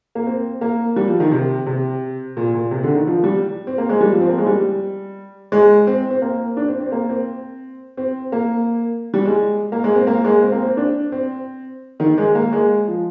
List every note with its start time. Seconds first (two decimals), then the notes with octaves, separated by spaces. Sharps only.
0.15 A#3
0.26 C4
0.61 A#3
0.96 G3
1.08 F3
1.20 D#3
1.32 C3
1.66 C3
2.37 A#2
2.54 A#2
2.71 C3
2.83 D3
2.95 D#3
3.07 F3
3.24 G3
3.67 C4
3.78 A#3
3.89 G#3
4.01 G3
4.11 F3
4.21 C4
4.29 A#3
4.38 G#3
4.46 G3
5.52 G#3
5.87 C4
6.10 C4
6.22 A#3
6.57 D4
6.68 C4
6.80 C4
6.92 A#3
7.09 C4
7.97 C4
8.32 A#3
9.14 G3
9.25 G#3
9.72 A#3
9.84 G#3
9.95 C4
10.07 A#3
10.25 G#3
10.42 C4
10.52 A#3
10.62 C4
10.77 D4
11.12 C4
12.00 D#3
12.18 G#3
12.35 A#3
12.53 G#3
12.87 F3